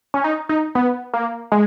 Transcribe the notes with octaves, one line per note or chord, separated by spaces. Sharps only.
C#4
D#4
D#4
B3
A#3
G#3